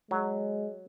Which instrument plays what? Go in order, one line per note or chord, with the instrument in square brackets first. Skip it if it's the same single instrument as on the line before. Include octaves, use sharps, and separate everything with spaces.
[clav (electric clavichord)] F#3 [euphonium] G#3